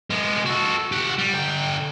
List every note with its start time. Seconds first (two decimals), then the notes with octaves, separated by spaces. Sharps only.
0.10 G#3 B3
0.45 F#4 A4
0.92 G4 F#5
1.18 G3
1.34 D3 G5